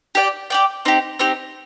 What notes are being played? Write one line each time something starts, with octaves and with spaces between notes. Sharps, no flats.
G4 D5 G5
G4 D5 G5
C4 D#4 G4
C4 D#4 G4